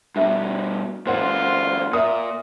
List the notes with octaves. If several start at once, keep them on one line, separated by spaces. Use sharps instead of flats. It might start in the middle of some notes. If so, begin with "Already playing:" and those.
G2 B2 D4 G#4 E5
A#2 E3 F4 A#4 C5 F#5
A#2 A#4 E5 D#6